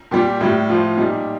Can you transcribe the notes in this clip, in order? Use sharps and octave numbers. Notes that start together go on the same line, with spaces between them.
A#2 G3 G4
A2 G3
A2 F3 F4
A#2 G3 D#4